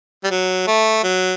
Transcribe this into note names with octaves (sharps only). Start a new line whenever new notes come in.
G3
F#3
A3
F#3